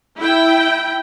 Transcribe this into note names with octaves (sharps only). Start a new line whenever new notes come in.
E4 G5